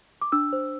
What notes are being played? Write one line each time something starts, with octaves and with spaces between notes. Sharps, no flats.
D6
D4 E6
C5